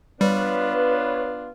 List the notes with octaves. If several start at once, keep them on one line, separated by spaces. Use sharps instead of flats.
G3 B3 D4 F4 B4 C#5